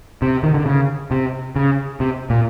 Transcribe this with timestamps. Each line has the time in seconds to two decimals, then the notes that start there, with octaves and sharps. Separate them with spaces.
0.22 C3
0.43 D#3
0.54 D3
0.66 C#3
1.11 C3
1.56 C#3
2.00 C3
2.30 A#2